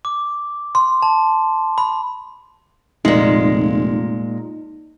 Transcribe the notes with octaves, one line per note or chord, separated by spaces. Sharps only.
D6
C6
A5
B5
F1 A#2 G#3 D#4